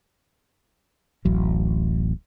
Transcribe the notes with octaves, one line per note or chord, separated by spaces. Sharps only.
D1 A1 F#3